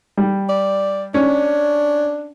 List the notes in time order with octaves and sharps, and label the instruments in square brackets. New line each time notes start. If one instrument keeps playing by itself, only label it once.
[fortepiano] G3
[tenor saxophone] D5
[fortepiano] C#4 [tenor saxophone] D4